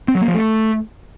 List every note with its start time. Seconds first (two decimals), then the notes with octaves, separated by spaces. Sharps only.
0.08 C4
0.15 F#3
0.21 A#3
0.28 F3
0.35 A3